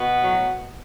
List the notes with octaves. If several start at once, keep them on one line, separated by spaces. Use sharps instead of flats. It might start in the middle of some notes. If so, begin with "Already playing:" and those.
Already playing: B2 B3
A2 F#3